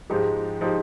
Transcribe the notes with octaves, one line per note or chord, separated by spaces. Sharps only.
G#2 F3 G#3 D#4 G4
F3 G#3 D#4 G4